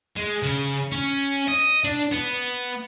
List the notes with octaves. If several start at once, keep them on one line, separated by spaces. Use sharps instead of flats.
G#3
C#3
C#4
D#5
D4
B3